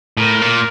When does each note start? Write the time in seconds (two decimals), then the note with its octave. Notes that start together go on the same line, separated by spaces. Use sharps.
0.17 A2 A#4
0.41 A#2